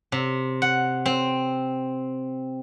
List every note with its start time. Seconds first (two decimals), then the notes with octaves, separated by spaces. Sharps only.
0.12 C3
0.62 F#5
1.06 C4